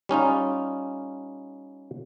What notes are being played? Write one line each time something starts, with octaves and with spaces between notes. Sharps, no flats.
G3 C#4 D#4 F4